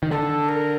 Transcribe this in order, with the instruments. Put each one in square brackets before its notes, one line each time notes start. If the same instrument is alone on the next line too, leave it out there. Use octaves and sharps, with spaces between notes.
[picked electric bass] D#3
[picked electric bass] D3 [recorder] A4
[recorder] A#4